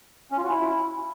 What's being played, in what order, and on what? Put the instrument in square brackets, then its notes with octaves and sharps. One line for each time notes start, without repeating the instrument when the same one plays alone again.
[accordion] C#4
F4
F#4
E4